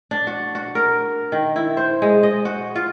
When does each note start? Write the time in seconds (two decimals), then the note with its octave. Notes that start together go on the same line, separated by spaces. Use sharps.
0.11 D4
0.27 F#4
0.55 F#4
0.75 A#4
1.32 D#3
1.56 E4
1.77 C5
2.02 G#3
2.23 D#5
2.45 F#4
2.76 F4